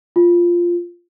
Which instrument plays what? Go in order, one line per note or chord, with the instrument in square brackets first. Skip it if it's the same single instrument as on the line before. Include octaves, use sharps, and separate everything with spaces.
[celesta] F4